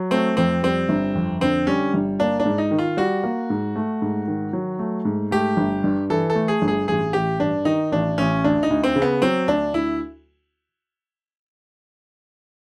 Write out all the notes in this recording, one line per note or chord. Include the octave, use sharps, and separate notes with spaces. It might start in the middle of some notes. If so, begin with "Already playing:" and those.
Already playing: F#3
A3 C4
F2 C4
G3 C4
G1
F2
D3 C4
G3 C#4
G1
A#3 D4
D4
G#2
D#4
D#3
F4
G3 F#4
A#3
G#2
A3
G#2
D#3
F#3
A3
G#2
A3 G4
G1
G2
E3 A4
A4
A3
G#4
G1
G#4
A1 G#4
A1 G4
G2 D4
D#3 D#4
A1 D4
A1 C#4
D2 D4
D#4
D2
C4
C#3
B3
F#3 C4
D2 D4
D2 E4